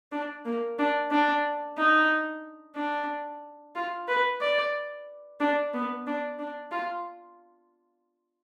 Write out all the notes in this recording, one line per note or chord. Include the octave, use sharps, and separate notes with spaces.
D4
A#3
D4
D4
D#4
D4
F4
B4
D5
D4
B3
D4
D4
F4